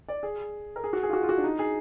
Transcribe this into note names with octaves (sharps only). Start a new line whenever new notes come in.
D5
G#4
A#4
G#4
F#4
G#4
F4
F#4
F4
F#4
D4
D#4
G#4